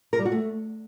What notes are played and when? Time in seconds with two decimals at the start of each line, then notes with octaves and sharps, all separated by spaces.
0.13 A#4
0.19 G3
0.25 F#4
0.32 A3